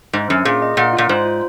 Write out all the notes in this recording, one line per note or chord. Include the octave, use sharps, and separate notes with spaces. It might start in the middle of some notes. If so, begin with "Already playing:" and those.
G#2 C5
F#2 C#4
A#2 G#4
D#5
A#2 F#5
F4
A#2
G#2 C5
F4